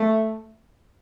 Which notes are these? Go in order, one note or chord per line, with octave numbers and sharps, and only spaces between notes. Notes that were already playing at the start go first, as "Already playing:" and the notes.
Already playing: A3